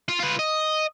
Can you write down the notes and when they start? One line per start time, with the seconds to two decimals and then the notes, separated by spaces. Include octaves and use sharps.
0.09 F4
0.20 F4 B4
0.39 D#5